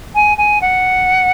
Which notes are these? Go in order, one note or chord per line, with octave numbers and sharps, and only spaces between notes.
G#5
G#5
F#5